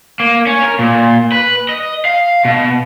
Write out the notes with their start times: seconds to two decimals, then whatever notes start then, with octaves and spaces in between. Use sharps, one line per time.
0.20 A#3
0.47 C#4
0.63 A#4
0.79 A#2
1.32 B4
1.69 D#5
2.05 F5
2.45 B2